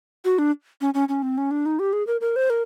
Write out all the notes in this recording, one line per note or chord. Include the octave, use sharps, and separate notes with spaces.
F#4
D4
C#4
C#4
C#4
C4
C#4
D4
D#4
G4
G#4
A#4
A#4
C5
A#4